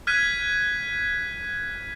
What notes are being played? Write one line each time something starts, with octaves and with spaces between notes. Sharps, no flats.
F6 F#6 G#6 B6 D#7